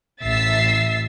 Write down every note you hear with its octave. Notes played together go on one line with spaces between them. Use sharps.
A1 E5 E6 A6 C7